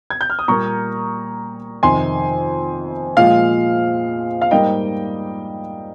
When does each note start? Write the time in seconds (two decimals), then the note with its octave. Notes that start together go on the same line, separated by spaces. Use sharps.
0.10 G#6
0.21 G6
0.30 F6
0.39 D#6
0.48 A#2 G3 A#3 A#5 C#6
1.83 F2 C3 D#3 G#5 C6
3.17 A#2 F3 G#3 F5
4.42 F5
4.51 G#2 G3 A#3 D#5 G5